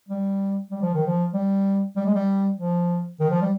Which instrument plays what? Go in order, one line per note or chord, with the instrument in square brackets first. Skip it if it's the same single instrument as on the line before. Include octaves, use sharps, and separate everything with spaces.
[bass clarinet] G3
G3
F3
D#3
F3
G3
G3
G#3
G3
F3
D#3
F3
G3